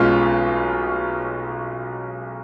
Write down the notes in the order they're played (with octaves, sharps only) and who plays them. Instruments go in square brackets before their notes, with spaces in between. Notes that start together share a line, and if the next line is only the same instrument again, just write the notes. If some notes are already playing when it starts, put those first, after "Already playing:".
Already playing: [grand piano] B1 B2 G#3 C#4 F4